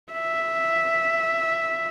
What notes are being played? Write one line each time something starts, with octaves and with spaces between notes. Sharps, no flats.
E5